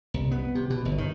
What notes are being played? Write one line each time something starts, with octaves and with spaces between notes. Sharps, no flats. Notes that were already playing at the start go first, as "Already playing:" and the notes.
C2
B3
C3
B2
G1
D#3